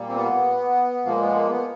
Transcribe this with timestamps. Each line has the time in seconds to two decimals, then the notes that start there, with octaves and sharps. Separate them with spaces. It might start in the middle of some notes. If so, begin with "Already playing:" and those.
Already playing: A#2 G3 A#3
0.09 C4
0.16 B3
1.05 A#2 F3 G#3 A#3
1.20 B3
1.35 A#3
1.50 B3